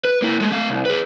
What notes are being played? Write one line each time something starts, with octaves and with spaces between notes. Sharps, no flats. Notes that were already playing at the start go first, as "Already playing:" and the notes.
B4
A#3 E4
G#3 A3
A3 F5
C2
G#4 B4